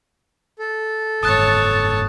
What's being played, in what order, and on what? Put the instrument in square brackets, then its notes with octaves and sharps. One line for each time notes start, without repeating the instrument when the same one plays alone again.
[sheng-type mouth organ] A4
[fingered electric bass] F#1 G#2 [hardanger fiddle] C#5 A5 [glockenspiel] D#6 F#6 A6